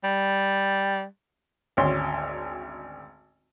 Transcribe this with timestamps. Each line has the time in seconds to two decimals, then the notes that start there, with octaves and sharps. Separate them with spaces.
0.04 G3
1.77 G#1 D2 C#4 C6